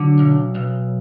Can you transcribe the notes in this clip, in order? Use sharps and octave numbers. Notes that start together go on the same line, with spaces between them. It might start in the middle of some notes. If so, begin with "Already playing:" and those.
Already playing: D3 F#3
B1
B1